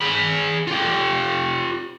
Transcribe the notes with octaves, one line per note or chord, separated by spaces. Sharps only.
G#4 B5
F4 G4